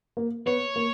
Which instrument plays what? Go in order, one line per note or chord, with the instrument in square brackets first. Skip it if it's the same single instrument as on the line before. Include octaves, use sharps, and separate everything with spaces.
[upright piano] A#3
[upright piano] B3 [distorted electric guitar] C#5
[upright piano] A#3